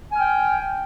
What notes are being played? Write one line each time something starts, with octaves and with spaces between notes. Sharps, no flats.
G5 G#5 F6